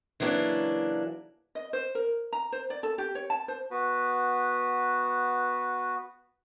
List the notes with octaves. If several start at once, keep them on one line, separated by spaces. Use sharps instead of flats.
C#3 E3 F#3 A#3 D4
D#5
C5
A#4
A#5
C5
D5
A4
G4
C#5
A5
C5
B3 F#4 B4